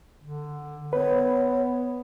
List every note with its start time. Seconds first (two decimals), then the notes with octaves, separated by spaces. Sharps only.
0.23 D3
0.93 B3 B4 C#5